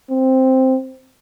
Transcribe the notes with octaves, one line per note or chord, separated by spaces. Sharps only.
C4